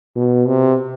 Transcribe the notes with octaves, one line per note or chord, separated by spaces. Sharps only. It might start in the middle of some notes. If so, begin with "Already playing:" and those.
B2
C3